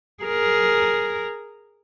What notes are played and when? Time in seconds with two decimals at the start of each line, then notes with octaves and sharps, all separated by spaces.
0.24 G#4 A#4